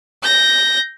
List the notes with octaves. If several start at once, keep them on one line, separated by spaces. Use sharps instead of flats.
G6 A#6